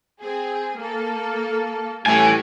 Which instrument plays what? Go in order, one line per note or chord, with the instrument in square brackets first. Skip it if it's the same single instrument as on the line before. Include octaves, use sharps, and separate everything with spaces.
[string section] C4 G#4
A#3 A4
[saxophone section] A2 [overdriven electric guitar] E3 G#5 [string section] G3 C#4